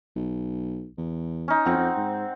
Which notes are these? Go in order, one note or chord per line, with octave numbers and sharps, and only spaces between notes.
B1
E2
C#4 D#4
F2 C4 F#5
F2
G#2